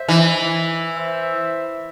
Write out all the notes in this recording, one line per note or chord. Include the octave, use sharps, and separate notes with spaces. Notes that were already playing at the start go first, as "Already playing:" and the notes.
Already playing: C5 E5
E3
C5 E5